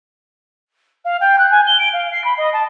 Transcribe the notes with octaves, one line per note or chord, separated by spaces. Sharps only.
F5
G5
F#6
G#5
G7
D7
F5
C7
B5
D#5
A5